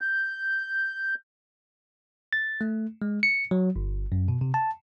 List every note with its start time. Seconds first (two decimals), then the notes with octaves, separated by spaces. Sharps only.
0.01 G6
2.33 A6
2.61 A3
3.02 G#3
3.23 C#7
3.51 F#3
3.76 G1
4.12 F#2
4.28 B2
4.41 C3
4.54 A5